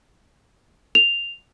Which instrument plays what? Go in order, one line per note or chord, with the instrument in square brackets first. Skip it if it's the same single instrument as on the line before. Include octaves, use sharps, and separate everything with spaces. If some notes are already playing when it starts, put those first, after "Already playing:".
[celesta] F7